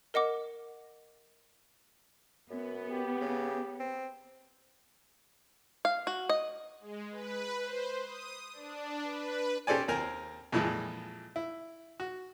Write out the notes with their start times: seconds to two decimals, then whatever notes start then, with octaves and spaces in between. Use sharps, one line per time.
0.14 A#4 D#5 F#5 D6
2.50 F#2 B3
2.88 G4
3.21 C#3
3.80 C4
5.85 F5
6.07 F#4
6.29 D#5
6.81 G#3
7.11 B4
7.63 C5
8.02 D#6
8.53 D4
9.04 B4
9.67 C#4 G4 A4 C5 D5 G#5
9.88 D#2 C4 A#4 G#5 A#5
10.52 F2 A#2 E3 F3 G#3
11.36 E4
12.00 F#4